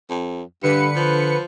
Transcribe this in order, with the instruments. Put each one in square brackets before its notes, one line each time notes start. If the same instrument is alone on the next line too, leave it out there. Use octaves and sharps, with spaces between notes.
[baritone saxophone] F2
[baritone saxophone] G2 [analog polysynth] D3 B4 C#7
[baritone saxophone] F3